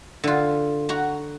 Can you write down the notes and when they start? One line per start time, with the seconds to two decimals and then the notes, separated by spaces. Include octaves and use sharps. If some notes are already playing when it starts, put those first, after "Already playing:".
0.24 D3 F4
0.89 F#4 A#5